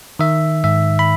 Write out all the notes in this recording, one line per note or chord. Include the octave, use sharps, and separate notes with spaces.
D#3 E5
G#2 E5
B5